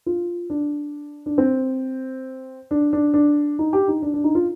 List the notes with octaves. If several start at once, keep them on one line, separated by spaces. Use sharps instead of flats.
F4
D4
D4
C4
D4
D4
D4
D#4
G4
D#4
D4
D4
D#4
F4